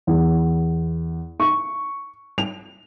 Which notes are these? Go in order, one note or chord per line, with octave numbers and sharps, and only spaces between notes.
E2
C#6
F7